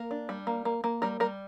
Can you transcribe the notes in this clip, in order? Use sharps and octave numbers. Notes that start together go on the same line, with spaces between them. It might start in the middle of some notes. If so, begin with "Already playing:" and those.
Already playing: A#3 A#4
D4
G3
A#3
A#3
A#3
G3 A#4
G3 A#4